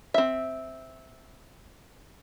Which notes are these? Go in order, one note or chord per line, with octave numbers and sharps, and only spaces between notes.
C4 E5